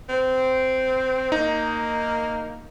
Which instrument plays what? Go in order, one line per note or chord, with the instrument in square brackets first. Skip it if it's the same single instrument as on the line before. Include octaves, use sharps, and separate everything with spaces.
[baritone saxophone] C4
[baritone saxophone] A#3 [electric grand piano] D#4